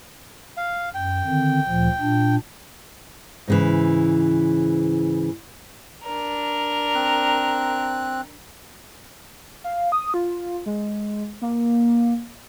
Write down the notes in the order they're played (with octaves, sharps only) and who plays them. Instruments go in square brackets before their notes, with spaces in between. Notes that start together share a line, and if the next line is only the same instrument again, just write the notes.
[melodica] F5
[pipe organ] F#2 [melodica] G5
[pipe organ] D3 D#3 C4
D2 A#2 F3
A#2 D4
[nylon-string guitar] G#2 C#3 E3
[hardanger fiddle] D4 A#4
[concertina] C4 F#6
[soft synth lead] F5
D#6
F4
G#3
A#3